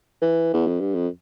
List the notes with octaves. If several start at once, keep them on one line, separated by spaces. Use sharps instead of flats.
E3
E2
F2
G2
F2